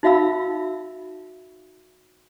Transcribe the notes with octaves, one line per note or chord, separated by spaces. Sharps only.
D#4 F#4 E5 F5 B5 E6